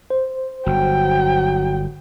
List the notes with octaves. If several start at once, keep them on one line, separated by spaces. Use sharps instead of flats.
C5
G1 F#3 G5